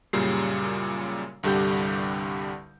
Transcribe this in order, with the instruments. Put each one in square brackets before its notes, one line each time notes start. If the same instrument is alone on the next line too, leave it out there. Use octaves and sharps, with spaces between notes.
[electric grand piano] F#2 A#2 C#3 G3 C7
C2 G2 D3 G3 G4 G6